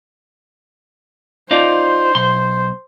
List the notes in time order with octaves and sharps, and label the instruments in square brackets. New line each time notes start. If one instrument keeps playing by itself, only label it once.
[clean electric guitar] D#4 F4 D5 [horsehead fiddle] C5
[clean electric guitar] B1 C6